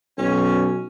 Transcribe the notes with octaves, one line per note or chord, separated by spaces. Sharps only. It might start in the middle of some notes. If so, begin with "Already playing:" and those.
B1 C#4